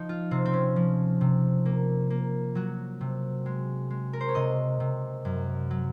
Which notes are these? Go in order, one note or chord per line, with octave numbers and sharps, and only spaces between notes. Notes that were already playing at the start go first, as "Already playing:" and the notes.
Already playing: F3 D#4
F4
C3 C4
C4
C#4
F3
C3
A#3
A#3
F#3 F#4
C3
G#3
G#3
A#4
C5
C#5
C3 D#5
C3
F#2
F#3